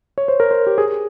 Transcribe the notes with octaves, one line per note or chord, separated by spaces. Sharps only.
C#5
C5
A#4
C5
G4
G#4